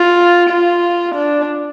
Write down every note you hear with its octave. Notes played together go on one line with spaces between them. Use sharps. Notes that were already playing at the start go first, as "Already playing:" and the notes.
Already playing: F4
F4
D4